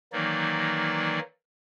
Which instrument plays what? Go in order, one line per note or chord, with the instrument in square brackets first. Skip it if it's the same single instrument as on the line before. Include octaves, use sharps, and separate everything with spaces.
[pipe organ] D#3 E3 F#3 A#3 D#4 D5